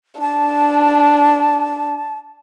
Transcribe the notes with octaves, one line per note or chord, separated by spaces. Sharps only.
D4 A5